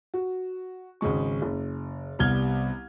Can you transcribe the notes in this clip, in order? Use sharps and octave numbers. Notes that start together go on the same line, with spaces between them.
F#4
G#1 C#3 G#3 C#6
F#1
C2 G3 B3 F6 G#6 G7